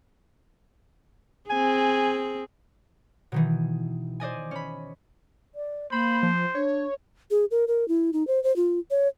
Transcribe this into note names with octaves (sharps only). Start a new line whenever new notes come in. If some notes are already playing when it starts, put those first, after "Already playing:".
C4 G#4 G#5
B2 D#3 E3
C5 D5 D#5 G#5
C#4 B5
D5
A#3 C5 B5
F3
D4 C#5
G#4
A#4
A#4
E4
D#4
C5
C5
F4
C#5